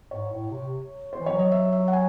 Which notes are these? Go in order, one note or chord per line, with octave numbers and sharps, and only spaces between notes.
G#2 C#5
A2
C3
C5
E3
C#5
F#3
D#5
E5
E5
F#5
G#5